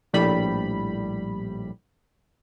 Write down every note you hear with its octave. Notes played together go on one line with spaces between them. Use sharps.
A#1 A2 G3 B5